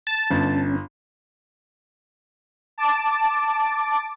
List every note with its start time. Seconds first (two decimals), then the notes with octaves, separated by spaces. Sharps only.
0.07 A5
0.30 G1 C#4
2.78 A5 D6